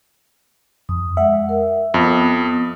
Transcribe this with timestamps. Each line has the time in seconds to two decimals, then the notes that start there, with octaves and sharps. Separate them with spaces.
0.89 F2 D#6
1.17 G#3 E5 F#5
1.49 A#4
1.94 F2 B3 D#6